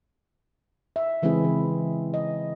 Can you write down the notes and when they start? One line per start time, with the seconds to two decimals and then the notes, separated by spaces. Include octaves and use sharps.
0.96 E5
1.22 C#3 E3 G#3 C4 E4 G#4
1.45 E3
2.14 D#5